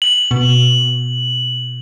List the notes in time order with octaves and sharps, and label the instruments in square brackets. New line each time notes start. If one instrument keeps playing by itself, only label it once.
[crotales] F#7
[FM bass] B2